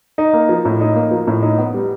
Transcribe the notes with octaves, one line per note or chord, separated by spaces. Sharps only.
D#4
A#3
F3
A2
D#4
A#3
F3
A2
D#4
B3
G3